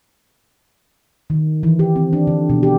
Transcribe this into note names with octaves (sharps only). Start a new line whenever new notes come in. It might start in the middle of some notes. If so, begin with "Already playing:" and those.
D#3
E3
G4
C4
D4
D3
B2
G4